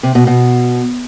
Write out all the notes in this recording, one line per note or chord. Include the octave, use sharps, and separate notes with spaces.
C3
B2
B2